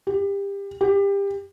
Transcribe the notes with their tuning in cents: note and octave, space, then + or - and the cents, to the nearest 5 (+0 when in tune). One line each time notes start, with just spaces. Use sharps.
G4 +25
G4 +25